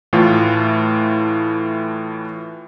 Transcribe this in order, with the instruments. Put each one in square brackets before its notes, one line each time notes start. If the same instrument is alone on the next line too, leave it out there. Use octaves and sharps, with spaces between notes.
[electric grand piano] A2 E3 A3 F4